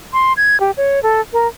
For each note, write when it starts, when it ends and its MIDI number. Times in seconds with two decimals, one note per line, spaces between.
0.13 0.33 84
0.37 0.59 92
0.60 0.71 67
0.77 1.02 73
1.03 1.21 69
1.33 1.47 70